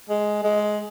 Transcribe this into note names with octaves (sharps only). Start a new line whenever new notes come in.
G#3
G#3